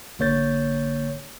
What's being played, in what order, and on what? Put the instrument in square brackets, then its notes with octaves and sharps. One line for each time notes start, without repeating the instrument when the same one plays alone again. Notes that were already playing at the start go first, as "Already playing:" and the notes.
[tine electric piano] A1 D3 A#3 C#5 G6 A6